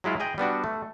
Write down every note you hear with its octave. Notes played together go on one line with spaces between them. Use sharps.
F#3 G#3 E4 F4
G#4 D#5 G5
G3 B3 D4 F#4
A3